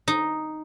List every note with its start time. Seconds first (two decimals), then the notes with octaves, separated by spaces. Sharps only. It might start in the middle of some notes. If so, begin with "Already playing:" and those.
0.08 D#4